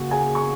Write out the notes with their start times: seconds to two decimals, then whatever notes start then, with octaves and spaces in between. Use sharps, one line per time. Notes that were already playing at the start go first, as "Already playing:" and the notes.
Already playing: C#3 A#3 F#4 F#5
0.11 G#4 G#5
0.35 C#6